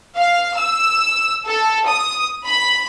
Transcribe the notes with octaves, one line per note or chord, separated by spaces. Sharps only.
F5
E6
A4
D#6
B5